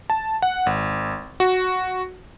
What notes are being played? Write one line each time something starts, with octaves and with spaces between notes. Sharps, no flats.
A5
F#5
G#1
F#4